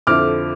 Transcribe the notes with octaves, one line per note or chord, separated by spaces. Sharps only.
F2 D3 F3 C4 E4 D6 F6